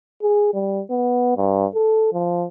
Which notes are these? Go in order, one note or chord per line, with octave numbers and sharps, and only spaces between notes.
G#4
G3
B3
G2
A4
F3